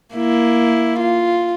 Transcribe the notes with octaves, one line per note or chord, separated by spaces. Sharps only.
A#3 E4
F4